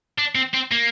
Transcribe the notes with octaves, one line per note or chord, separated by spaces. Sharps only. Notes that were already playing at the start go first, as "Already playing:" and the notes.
D4
C4
C4
A#3